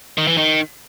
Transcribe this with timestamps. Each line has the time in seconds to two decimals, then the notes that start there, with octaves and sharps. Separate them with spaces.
0.18 D#3
0.27 E3
0.38 D#3